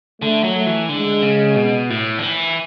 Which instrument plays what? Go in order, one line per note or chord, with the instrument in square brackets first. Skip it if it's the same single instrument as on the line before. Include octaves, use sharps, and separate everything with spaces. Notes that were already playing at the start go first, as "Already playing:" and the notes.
[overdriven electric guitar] D3 [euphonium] A3
[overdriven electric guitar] F#3
[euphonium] A3
[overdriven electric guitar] E3
[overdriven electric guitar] D3 [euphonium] G#3
[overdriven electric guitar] C#3
B2
A2
D3
E3